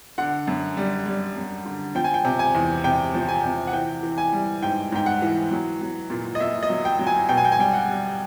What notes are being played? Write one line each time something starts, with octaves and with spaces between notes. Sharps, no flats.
D3 F#5
F#2
G3
G3
F#2
D3
F3 G5
G#5
G5
C3
G#5
E2
C3 G5
F3
G#5
C3
F#5
E3 G5
E3
G#5
G3
G#2 G5
G#2 G5
F#5
E3
F#3
F#3
A#2
D#5
A#2 E5
D#5
F#3
G5
F#3
G#5
B2 G5
G#5
G5
G#5
G3 G5
F#5
G3